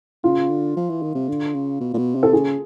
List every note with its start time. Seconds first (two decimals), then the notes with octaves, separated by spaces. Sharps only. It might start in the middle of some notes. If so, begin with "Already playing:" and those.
0.24 C#3 F4
0.49 D3
0.77 F3
0.90 E3
1.02 D#3
1.15 C3
1.28 D3
1.54 C#3
1.80 B2
1.93 A#2
1.98 B2
2.15 C3
2.23 A4
2.33 C#3 G#4